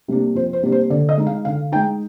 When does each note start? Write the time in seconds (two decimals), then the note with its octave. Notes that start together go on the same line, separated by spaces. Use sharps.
0.08 C3 G3 A#3 D4
0.35 F2 C5
0.53 C5
0.63 C3 G3 A#3 D4
0.72 C5
0.90 D3 D5
1.09 D#5
1.17 G#3 D#4
1.27 F5
1.45 D3 F5
1.72 G#3 D#4 G5